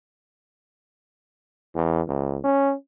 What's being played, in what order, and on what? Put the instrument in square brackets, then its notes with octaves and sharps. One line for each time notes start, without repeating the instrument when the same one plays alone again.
[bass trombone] E2
C#2
C#4